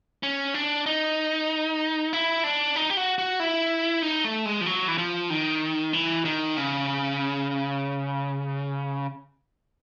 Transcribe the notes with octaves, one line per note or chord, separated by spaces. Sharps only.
C#4
D4
D#4
E4
D4
D#4
G4
F#4
F#4
E4
D#4
A3
G#3
F3
F#3
E3
F3
D#3
E3
D#3
C#3